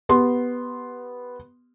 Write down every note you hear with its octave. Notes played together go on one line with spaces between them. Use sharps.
B3 G4 C6